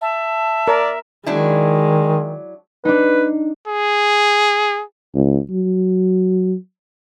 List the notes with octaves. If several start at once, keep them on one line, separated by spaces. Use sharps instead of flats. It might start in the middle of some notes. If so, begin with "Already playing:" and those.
E5 A5
A#4 D5
D#3 F#3 G#3 D4 E4
D4 D#4 B4
G#4
C#2
F#3